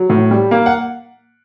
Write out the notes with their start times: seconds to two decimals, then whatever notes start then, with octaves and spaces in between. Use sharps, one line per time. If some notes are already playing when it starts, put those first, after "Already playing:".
Already playing: F#3
0.10 A2
0.31 G3
0.51 A#3
0.66 F#5